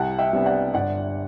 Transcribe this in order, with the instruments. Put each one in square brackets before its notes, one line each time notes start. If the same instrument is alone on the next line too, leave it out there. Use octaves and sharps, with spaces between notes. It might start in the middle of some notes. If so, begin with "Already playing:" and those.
Already playing: [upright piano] C2 F#5 A5
E5 G5
C3 G3 B3 D4
D5 F#5
G1 D5 F#5